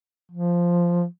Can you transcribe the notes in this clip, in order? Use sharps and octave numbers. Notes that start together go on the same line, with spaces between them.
F3